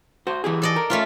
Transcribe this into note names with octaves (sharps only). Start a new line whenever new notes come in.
F#4 C5
E3 G4 G#4
A4 D5 D#5
A#4
A3 C#4 F4